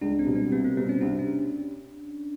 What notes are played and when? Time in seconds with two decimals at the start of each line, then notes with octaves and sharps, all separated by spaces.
0.01 C#2 D4
0.19 C4
0.27 B2 G3
0.35 C4
0.52 C2 B3
0.64 A#3
0.77 B2 G3 B3 C4
0.89 C#4
1.01 C2 D4
1.19 C#4